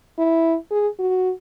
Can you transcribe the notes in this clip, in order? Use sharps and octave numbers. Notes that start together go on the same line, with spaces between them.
E4
G#4
F#4